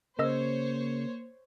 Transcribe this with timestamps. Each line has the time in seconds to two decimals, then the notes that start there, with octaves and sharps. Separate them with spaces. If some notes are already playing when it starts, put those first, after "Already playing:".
0.19 C#3 A#3 A#4 C5 C#5 D#5 E6